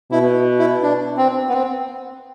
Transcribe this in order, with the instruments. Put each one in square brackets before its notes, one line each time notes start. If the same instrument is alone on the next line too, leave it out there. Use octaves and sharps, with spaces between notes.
[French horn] B2 [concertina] E4
[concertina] E4
D4
C4
B3
C4